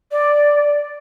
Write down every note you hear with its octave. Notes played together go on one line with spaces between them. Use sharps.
D5